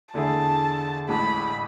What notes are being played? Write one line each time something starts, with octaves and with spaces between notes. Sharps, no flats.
E2 D3 A3 E4 G#4 A5
A1 A2 G#3 B5